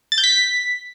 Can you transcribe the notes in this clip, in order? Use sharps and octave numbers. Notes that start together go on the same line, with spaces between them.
A6
G6
B6